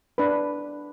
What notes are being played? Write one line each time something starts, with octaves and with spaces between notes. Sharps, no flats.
D4 B4